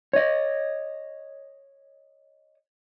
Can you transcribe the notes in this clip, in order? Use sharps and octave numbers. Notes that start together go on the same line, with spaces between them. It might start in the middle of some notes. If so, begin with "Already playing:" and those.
C#5 D#5